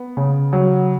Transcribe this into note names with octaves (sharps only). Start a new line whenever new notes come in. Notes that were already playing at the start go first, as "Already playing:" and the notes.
Already playing: B3
C#3
F#3